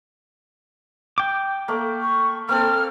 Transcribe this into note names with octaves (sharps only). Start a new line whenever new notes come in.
G5 D6
A3 A#3
C#6
A#3 C4 A4 F6